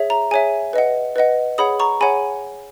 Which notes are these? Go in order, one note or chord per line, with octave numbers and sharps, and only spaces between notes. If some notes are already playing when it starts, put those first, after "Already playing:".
Already playing: G#4 C#5 E5
A#5
G#4 C#5 E5 G#5
B4 D#5 F#5
B4 D#5 F#5
G#4 C#5 F#5 B5 D#6
A#5 C#6
G#4 C#5 F#5 G#5 B5